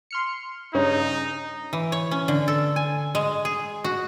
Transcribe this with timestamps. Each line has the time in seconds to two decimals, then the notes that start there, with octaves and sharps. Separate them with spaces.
0.11 C6 F6 C#7
0.75 G2 C#3 C#4 D#4
1.73 E3
1.92 C#5
2.11 C#4
2.28 D3
2.48 A4
2.76 G#5
3.15 G#3
3.45 G#4
3.84 F#4